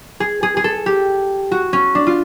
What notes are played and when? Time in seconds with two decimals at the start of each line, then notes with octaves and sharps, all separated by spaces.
0.20 G#4
0.43 G#4
0.57 G#4
0.64 A4
0.86 G4
1.51 F#4
1.73 C#4
1.95 D4
2.07 F4